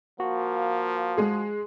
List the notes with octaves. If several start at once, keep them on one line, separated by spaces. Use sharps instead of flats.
F3 A#3 F#4
G#3 G#4